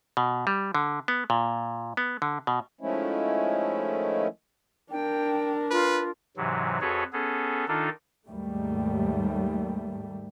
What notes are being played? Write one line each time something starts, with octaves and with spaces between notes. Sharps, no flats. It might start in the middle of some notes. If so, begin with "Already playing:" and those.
B2
G3
D3
B3
A#2
B3
D3
B2
D#3 F3 G#3 A3 C#4 E4
D4 A#4 G5
F4 B4
G#2 C3 E3 F#3
F2 F#4 G#4 A4 B4 C#5
B3 C#4 G#4 A4
D#3 D4 D#4 F4 A4
D#2 G#2 G3 A3